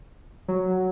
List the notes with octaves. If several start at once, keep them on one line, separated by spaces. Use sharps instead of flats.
F#3